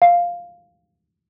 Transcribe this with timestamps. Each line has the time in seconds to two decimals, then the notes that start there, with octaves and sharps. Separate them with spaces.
0.02 F5